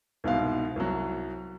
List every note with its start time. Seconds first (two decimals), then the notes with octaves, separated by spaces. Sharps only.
0.24 C2 G#2 B2 F5
0.76 C2 F#3